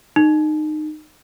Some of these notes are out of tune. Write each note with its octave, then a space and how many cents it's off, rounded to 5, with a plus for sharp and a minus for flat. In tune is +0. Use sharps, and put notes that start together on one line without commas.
D#4 -25